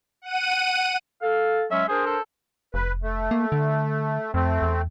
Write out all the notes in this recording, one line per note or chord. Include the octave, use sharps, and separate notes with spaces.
F#5 D#7
A4 F5
F#3 G#3 C#4 E5
D4 G#4 A#4 C5
A4
F1 B4
A3
A#3
D3
F2 A3 C4
E2